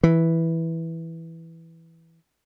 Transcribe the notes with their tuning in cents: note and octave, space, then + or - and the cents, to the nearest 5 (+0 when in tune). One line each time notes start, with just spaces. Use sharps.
E3 -5